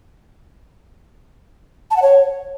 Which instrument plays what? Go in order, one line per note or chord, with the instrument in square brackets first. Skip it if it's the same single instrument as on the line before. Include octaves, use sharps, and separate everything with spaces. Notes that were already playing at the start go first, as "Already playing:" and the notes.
[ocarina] A5
F#5
C#5